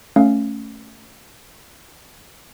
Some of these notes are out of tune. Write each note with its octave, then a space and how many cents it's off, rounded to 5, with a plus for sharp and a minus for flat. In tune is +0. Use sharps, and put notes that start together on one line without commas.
A3 +0 C#4 +0 F5 +0